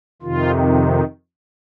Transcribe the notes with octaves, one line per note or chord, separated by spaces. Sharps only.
F2 C3 D#3 F4